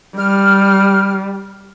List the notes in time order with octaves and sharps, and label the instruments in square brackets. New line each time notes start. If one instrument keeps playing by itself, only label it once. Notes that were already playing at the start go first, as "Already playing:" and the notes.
[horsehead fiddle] G3 [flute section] F6